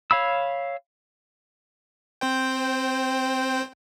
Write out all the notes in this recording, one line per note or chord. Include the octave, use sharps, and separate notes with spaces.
C#5 F5 B5 E6
C4 C5 G5